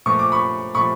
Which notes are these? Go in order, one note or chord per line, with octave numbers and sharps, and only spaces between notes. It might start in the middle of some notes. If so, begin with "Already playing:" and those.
A#2 F3 A3 C#6
D6
B5 C#6
A#2 F3 A3 B5 C#6